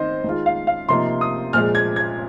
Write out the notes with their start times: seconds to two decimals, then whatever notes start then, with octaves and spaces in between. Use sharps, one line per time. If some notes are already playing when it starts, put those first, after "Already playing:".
Already playing: D#3 C4 C5 D#5
0.24 D#3 G#3 F4
0.46 F5
0.67 F5
0.89 C3 F3 A#3 D#4 C6
1.21 D#6
1.53 A#2 F3 G#3 F6
1.75 G#6
1.96 G#6